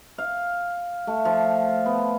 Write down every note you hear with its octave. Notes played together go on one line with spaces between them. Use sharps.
F5
A3
F3
B3